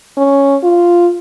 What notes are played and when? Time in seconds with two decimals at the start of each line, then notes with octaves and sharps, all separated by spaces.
0.17 C#4
0.63 F4